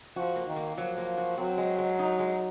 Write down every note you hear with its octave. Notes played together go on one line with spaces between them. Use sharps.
F3 F#4
A#3
D#3
A#3
F3 F#3
A#3
F#4
F#3 C4
G#3
G#3
D#4
G#3